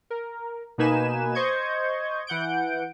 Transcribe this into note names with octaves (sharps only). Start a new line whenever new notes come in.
A#4
B2 A#3 D#4 B4 G#5 E7
C5 D#5 C#6 G6 G#6
E3 F#5 G6 D7